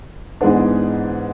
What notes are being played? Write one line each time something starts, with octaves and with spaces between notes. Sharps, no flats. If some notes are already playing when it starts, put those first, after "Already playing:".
G#2 E3 G#3 B3 D4